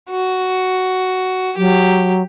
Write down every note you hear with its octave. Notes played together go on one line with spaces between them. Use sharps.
F#4
F#3 G4